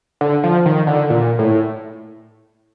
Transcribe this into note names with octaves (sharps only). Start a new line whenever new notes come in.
D3
F3
D#3
D3
A#2
A2